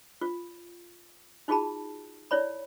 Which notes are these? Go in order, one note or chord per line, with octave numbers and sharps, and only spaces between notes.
F4
D#4 F4 F#4 G#4 A5 B5
E4 C#5 D5 B5